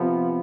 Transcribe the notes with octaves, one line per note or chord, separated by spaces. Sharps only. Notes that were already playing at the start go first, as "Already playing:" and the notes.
Already playing: C3 F3 B3